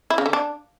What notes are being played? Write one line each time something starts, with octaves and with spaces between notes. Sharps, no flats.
E4
C#3
D3
D4